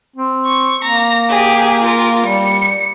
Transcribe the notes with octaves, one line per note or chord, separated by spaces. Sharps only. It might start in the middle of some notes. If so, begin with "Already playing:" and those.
C4
C#6
A#3 A#5
G4 G#4
F4 A#4
G3 C#7